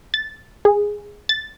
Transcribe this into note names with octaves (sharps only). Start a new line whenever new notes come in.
A6
G#4
A6